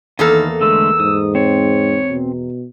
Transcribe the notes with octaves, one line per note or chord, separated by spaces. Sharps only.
E2 D#3 A#3 A4 F6
D3 G#3 A3 E6
G#2 D#6
C4 C#5
B2